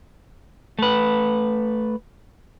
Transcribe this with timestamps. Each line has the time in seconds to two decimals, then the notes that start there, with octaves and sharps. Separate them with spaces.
0.79 A3 B4